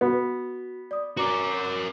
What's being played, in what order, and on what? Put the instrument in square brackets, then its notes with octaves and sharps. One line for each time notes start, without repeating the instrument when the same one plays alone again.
[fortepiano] B3 [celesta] F#4
[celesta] D5 D#6
[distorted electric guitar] F#4 A#4 [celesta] B4 A#5 D6